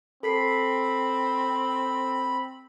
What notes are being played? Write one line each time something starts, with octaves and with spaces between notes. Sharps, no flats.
C4 A4 B5 B6 C7